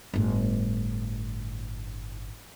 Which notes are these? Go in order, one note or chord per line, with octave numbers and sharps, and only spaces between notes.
G1 A2